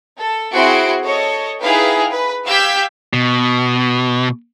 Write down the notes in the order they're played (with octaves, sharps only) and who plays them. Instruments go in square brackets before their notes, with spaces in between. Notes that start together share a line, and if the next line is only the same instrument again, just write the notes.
[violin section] A4
C4 E4 F#4 G#4 C6 D7
A4 C#5 D#5
D#4 E4 G#4 B4 F5 G5
B4
G4 F5 E6 G6 G#6 B6
[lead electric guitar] B2